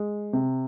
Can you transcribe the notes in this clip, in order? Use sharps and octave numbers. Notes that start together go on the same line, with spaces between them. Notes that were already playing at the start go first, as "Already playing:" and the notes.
Already playing: G#3
C3